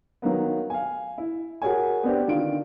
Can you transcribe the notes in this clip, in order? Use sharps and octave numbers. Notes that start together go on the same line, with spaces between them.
D#3 F#3 A#3 B3
F5 G#5
E4
F#4 G#4 A#4 C#5 G#5
B3 C4 D4 G4
D3 D#3 F4 D7